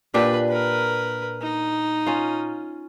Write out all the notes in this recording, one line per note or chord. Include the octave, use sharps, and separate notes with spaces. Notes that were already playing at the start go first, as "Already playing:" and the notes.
A#2 D4 G4 B4
A#4 B4
D#4
C#4 F4